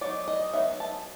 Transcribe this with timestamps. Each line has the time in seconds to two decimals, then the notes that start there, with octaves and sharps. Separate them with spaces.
0.01 F#3 B3 D#4 D5
0.28 D#5
0.53 F#3 B3 D#4 E5
0.80 A5